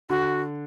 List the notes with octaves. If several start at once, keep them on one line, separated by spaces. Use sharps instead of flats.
D3 F#4